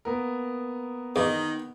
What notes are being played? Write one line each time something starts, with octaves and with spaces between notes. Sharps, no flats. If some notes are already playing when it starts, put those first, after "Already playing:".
A#3 B3 A#4
E2 D#3 D#4